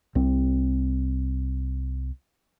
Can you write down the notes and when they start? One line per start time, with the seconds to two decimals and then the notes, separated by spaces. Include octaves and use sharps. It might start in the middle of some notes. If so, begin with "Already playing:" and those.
0.15 C2 C4